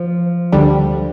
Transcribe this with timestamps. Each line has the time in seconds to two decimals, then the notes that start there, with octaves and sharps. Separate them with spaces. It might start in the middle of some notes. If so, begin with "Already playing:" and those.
Already playing: F3
0.52 D2 D3 G3